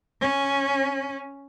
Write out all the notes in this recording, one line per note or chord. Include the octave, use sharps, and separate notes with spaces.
C#4